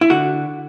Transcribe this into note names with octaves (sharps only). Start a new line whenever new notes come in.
E4
D3 F#4